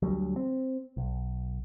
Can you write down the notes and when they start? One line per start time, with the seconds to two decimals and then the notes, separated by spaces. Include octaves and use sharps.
0.02 D2 F#3 G3
0.36 C4
0.97 B1